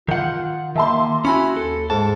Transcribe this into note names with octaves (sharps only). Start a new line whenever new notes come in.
D#3 F4 F#5 G6
D#3 A#3 E5 A5 C6
C#4 E4 F#4 G#5 B5
D#2 A4
G#2 A5